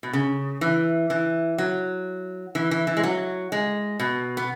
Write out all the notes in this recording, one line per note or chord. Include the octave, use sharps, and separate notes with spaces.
B2
C#3
E3
E3
F#3
E3
E3
E3
G#3
F#3
G#3
B2
B3